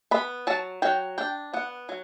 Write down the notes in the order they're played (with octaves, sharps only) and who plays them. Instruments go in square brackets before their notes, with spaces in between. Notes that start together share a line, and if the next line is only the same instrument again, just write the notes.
[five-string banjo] B3 B5
F#3 A5
F#3 G5
D4 G5
B3 F#5
F#3